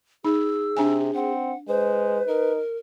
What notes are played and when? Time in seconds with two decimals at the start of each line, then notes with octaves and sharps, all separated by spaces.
0.25 D#4 G#4 E6
0.77 C3 D4 G#5
1.15 C4 F#5
1.68 G#3 B4 C5
2.28 D#4 A#4